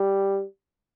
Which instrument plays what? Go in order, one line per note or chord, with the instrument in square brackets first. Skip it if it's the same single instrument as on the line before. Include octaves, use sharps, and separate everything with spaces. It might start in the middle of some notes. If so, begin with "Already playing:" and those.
Already playing: [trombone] G3